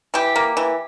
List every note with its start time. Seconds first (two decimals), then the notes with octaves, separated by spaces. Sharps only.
0.14 E3 G4
0.36 A#3
0.57 E3